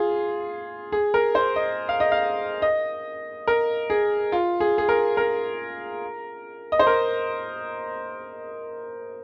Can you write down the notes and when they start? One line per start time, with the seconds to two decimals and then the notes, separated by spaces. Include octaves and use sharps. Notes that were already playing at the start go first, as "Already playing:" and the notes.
Already playing: F4 G#4
0.92 G#4
1.14 A#4
1.35 C5
1.56 D#5
1.89 F5
2.00 D#5
2.12 F5
2.62 D#5
3.47 A#4
3.90 G#4
4.32 F4
4.60 G#4
4.78 G#4
4.89 A#4
5.17 A#4
6.72 D#5
6.79 C5
6.87 A#4